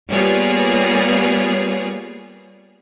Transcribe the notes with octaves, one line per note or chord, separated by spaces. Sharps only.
G3 A#3 B3 F4 G#4 C#5